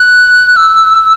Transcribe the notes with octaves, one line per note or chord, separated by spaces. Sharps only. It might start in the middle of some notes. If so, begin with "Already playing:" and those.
Already playing: F#6
E6